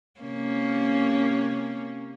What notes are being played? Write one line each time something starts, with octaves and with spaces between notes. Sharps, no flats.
C3 A#3 C#4